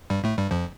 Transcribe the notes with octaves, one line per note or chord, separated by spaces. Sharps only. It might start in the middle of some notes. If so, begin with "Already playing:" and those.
G2 G3
A2 A3
G2 G3
F2 F3